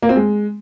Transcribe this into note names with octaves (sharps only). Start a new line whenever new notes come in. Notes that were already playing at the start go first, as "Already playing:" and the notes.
A#3
C4
G#3